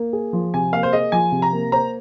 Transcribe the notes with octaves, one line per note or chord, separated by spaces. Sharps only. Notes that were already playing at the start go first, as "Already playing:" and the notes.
Already playing: A#3
G#4
F3
C3 G#5
A#3 F5
C5
G#4 D#5
F3 G#5
C3
A#5
A#3
C5 A#5